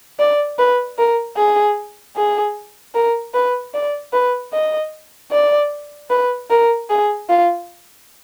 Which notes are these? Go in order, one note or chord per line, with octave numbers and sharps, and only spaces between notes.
D5
B4
A#4
G#4
G#4
A#4
B4
D5
B4
D#5
D5
B4
A#4
G#4
F4